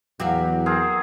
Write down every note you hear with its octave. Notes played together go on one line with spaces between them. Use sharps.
E2 F#3 F#4 G4 F5
C4 G#4 A#4